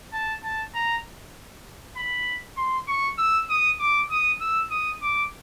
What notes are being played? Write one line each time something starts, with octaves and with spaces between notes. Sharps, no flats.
A5
A5
A#5
B5
C6
C#6
E6
D#6
D6
D#6
E6
D#6
D6